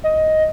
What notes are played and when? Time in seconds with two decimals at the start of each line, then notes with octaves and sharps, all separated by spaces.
0.04 D#5